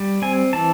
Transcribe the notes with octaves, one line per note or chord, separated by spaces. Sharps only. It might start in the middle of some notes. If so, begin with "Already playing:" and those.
Already playing: G3
C4 G#5
E3 A5